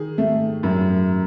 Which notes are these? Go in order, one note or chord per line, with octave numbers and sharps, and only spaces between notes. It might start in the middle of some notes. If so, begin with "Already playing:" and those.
Already playing: D#3 G#4
A3
F#2